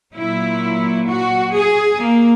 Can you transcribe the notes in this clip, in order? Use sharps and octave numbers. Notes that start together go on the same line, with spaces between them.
A#2 F#3 E4
F#4
G#4
A#3